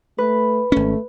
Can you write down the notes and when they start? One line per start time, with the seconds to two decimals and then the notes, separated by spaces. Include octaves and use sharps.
0.18 A3 B4
0.72 G#1 A3 C#4